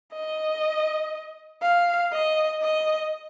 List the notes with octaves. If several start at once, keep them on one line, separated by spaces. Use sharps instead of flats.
D#5
F5
D#5
D#5